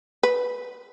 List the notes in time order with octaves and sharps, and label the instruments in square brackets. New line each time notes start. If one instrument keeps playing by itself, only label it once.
[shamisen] B4